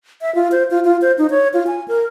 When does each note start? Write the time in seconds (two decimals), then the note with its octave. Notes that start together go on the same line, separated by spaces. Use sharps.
0.22 E5
0.35 F4
0.52 C5
0.71 F4
0.85 F4
1.02 C5
1.18 D#4
1.30 C#5
1.54 F4
1.67 G#5
1.88 A#4